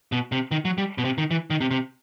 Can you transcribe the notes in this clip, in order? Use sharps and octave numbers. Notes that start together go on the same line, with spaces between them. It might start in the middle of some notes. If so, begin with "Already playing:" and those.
B2
C3
D#3
F#3
G3
B2
C3
D#3
E3
D#3
C3
C3